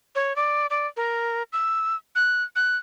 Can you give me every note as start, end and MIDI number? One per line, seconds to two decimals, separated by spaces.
0.15 0.35 73
0.36 0.66 74
0.70 0.87 74
0.97 1.43 70
1.53 1.96 88
2.16 2.43 90
2.56 2.77 90